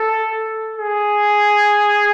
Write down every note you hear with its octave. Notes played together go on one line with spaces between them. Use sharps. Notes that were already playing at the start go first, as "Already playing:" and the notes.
Already playing: A4
G#4